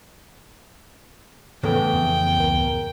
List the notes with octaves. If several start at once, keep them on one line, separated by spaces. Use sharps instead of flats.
E2 A2 C#3 B3 A4 B4 G5
F2
C#2 A#4